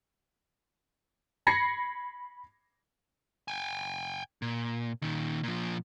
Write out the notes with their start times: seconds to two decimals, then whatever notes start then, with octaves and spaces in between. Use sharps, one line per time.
1.47 B5 G#6 A#6 C7 C#7
3.48 G5 G#5
4.42 A#2
5.02 A#2 D#3
5.43 A#2 F3